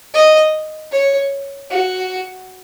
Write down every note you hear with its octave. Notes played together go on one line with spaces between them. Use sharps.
D#5
C#5
F#4